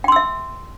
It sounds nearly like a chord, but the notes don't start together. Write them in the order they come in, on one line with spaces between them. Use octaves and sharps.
G5 C6 E6 E5